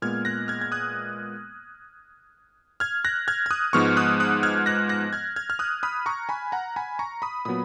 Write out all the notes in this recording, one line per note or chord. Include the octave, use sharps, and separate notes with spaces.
A#2 G#3 B3 F6 G#6
F#6 A#6
F6 G#6
G#6
D#6 F#6
F6 G#6
F#6 A#6
F6 G#6
G#6
D#6 F#6
G#2 F3 G#3 B3 C#6 F6
D#6 F#6
D#6 F#6
F6 G#6
F#6 A#6
F#6 A#6
F6 G#6
F6 G#6
F6
D#6 F#6
B5 D#6
A#5 C#6
G#5 B5
F#5 A#5
G#5 B5
A#5 C#6
B5 D#6
A#2 F#3 B3 B5 D#6